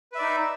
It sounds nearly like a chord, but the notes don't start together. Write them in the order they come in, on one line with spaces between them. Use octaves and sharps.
B4 E5 D5 D#4